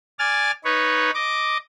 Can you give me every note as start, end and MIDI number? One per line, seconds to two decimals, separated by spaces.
0.19 0.51 74
0.19 0.51 80
0.19 0.51 89
0.19 0.51 93
0.65 1.11 63
0.65 1.11 71
0.65 1.11 73
1.14 1.57 75
1.14 1.57 86